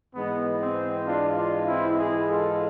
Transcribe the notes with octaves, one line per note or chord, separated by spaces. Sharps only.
G#2 E3 G#3 B3
C4
D4 F4
D4 F4
C4 E4
E4 G#4
F4 A4